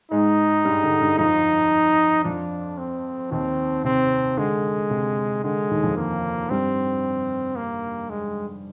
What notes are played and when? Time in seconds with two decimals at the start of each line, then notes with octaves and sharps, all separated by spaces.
0.12 G#2 G#3 D#4
0.65 G2 G3
0.83 D3
1.00 G2 G3
1.18 F2 F3 D#4
2.24 F2 F3 D4
2.78 C4
3.31 D#2 D#3 C4
3.84 C3 C4
4.37 D3 G#3
4.91 C3
5.44 D3 G#3
5.71 D#2 D#3
5.83 F2 F3
5.97 A#3
6.50 G2 G3 C4
7.56 A#3
8.10 G#3